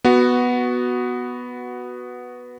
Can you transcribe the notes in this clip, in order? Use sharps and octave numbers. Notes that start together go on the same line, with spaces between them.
B3 F#4